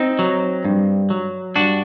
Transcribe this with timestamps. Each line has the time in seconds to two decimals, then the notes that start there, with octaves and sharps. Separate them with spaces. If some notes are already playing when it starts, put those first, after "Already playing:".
Already playing: C4 D#4
0.19 F#3
0.65 G2
1.10 F#3
1.56 G2 D4 F#4